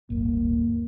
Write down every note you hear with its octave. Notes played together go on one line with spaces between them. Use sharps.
D1 G1 A#3